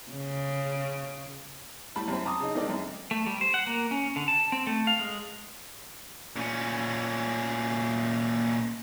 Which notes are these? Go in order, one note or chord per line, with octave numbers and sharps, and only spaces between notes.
C#3
A2 G3 A5 B5
F#2 C4
A5 A#5 D6 D#6
C#3 D#4
D#3 G#3 C4 D#4 A4 D5
F#2
A3
G3
C5
F#5
A#3
C#4
D3
A5
C4
A3
F5
G#3
A#2 C#4